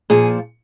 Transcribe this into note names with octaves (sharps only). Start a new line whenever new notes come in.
A#2 F3 G#4